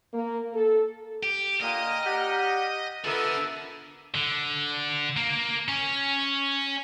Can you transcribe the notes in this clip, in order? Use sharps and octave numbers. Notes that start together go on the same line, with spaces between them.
A#3
A4
G4
A#2 D3 A#3 D#5 G5 A#5 F6
G4 D5 F#5
D3 B3 F4 A4 A#4 E5 E6
D3
A#3
C#4